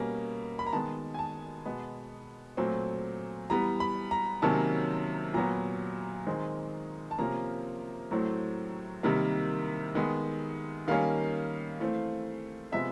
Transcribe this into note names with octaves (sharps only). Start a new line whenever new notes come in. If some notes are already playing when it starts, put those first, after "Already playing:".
Already playing: B2 G3 A#3 C#4 A#5
B5
A#5
D#3 G#3 B3 A5
G#5
A5
B2 G#3 B3
A#2 F#3 A3 C4
E3 G3 B3 A#5
B5
A#5
C3 D#3 F#3 A#3 C#4 A5
A#2 F#3 B3 A#5
D#3 G#3 C4
A5
C3 F3 A#3 C#4 A#5
A2 F#3 A3 C4
C3 D#3 G3 A#3
D#3 G#3 B3
D#3 G3 A#3 C#4 F5
E3 A3 C4
C3 F3 G#3 B3 E5